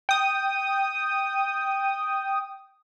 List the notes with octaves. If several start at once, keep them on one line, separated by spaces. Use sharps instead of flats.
G5 D#6